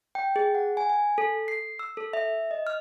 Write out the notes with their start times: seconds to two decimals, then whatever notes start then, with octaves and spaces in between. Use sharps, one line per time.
0.15 G5
0.36 G#4
0.55 F#5
0.77 G#5
0.90 G#5
1.18 A4
1.48 C7
1.79 E6
1.97 A4
2.13 E5
2.51 D#5
2.67 F6